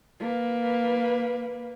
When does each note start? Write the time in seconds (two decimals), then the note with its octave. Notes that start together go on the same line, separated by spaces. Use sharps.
0.20 A#3 B4